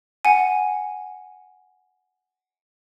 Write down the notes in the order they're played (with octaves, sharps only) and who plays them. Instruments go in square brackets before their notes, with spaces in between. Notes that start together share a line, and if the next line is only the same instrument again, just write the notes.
[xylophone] F#5 G#5